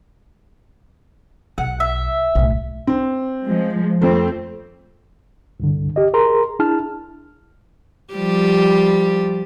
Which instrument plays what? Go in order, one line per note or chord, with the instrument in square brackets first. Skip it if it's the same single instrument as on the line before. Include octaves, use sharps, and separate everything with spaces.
[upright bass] B1 [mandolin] F#5
[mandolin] E5
[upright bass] B1 A2
[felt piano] C4
[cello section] F3 G#3
[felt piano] F2 A3 [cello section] C4
[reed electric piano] C2 G2 D3
G4 D#5
G#4 A#4 A#5 C6
D4 E4 G#4 A5 F6
[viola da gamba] F3 G3 G4